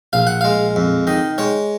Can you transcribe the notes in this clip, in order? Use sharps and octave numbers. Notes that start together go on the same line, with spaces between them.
A#1 F5
F#5
G#3 F5
F2
D#3 D#5
G#3 C#5